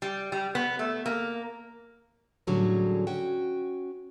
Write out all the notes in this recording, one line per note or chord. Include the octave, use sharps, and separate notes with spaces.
G3
G3
B3
A3
A#3
A2 D3 F#3 G3 C#4 G#4
C#4 F#4 G5